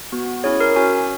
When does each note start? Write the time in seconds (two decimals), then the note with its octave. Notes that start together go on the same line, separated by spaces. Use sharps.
0.12 B3 F#4
0.44 C#4 E4 G#4 C#5
0.60 A#4
0.76 C#4 F#4 G#5